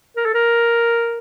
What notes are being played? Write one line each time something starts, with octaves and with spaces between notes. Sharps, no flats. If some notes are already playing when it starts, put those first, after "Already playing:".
A#4
A4
A#4